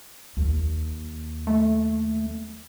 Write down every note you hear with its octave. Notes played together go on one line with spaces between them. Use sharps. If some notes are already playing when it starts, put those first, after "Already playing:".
D#2
A3